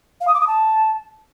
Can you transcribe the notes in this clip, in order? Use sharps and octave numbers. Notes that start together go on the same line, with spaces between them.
F5
D#6
D6
D#6
A5